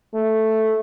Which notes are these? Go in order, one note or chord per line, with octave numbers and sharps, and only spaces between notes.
A3